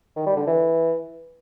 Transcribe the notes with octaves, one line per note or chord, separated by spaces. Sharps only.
D#3
G3
D3
E3